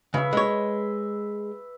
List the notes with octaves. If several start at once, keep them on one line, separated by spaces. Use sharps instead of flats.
C#3 B4 E5
G#3 C#5